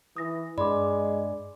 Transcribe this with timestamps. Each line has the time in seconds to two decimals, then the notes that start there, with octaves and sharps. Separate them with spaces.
0.16 E3 D#6 A#6
0.58 G2 G#3 D5 B5 C6 D6